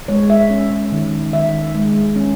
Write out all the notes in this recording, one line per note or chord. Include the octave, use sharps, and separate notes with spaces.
G#3 C#5
E5
C#4
D#3
D#3 E5
G#3
C#4